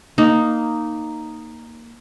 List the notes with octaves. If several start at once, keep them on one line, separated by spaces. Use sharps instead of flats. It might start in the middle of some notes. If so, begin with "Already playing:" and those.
A#3 D#4